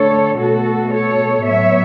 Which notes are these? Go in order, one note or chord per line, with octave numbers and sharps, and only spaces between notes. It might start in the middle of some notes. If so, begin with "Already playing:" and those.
Already playing: D3 A3 A4 C#5
B2 A3 F#4 A4
A4 C#5
A2 F#3 B3 C#5 E5